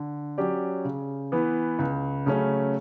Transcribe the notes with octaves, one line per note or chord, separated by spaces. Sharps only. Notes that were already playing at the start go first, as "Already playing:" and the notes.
Already playing: D3
F#3 C#4 G4 D5
C#3
E3 B3
C#2
C#3 F#3 A3 C#4